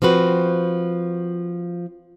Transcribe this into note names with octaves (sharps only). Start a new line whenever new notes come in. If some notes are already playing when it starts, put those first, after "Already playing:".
F3 C4 F#4 B4